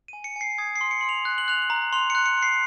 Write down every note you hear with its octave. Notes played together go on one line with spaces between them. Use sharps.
G#5 D#7
C#7
G#5 C7
D#6 G#6
C7
C6
C#7
C6 F#7
F7
F#6
F#7
F#6 F7
F#7
A#5
C6 F7
F#6 C#7
C#7
C6
C7